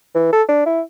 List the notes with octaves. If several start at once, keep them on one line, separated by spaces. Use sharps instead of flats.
E3
A4
D4
E4